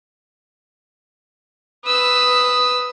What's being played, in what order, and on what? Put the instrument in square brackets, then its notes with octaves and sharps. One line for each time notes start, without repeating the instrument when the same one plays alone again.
[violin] B4 E6 [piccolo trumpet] D#6